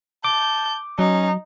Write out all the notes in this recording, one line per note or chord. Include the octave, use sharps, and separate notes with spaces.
A5 D6 G6
F#3 C#4 D#4